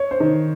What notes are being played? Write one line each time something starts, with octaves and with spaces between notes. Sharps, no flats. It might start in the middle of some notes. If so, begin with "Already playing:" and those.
Already playing: C#5
C5
D#3